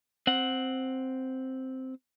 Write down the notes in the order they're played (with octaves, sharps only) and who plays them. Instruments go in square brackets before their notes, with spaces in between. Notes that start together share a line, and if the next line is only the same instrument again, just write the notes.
[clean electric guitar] C4 F#5